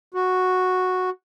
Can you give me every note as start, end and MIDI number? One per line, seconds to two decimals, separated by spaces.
0.14 1.10 66